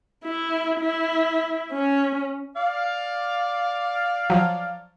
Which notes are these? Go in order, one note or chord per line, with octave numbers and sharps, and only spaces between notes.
E4
E4
C#4
D5 F5
F3 F#3